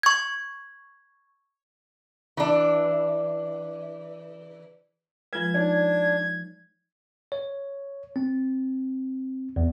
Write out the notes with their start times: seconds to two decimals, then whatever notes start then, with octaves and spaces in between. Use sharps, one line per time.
0.03 C#6 G#6
2.37 E3 D4
5.33 F3 G#3 F4 B4 G#6
5.54 D4 D#4 C#5 D5
7.32 C#5
8.16 C4
9.56 E2